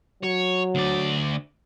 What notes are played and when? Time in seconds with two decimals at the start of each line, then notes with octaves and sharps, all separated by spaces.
0.23 F#3 C#5
0.75 D2 D5